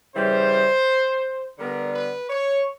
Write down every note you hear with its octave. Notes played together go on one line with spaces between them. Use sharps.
C#3 E3 G3 C5
D3 G3 B3 A#4
B4
C#5